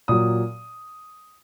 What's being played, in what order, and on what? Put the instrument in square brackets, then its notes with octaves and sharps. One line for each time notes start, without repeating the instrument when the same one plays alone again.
[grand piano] A#2 F#3 D#6